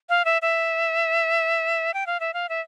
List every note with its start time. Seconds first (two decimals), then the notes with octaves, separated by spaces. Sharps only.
0.09 F5
0.25 E5
0.42 E5
1.94 G5
2.07 F5
2.20 E5
2.34 F5
2.49 E5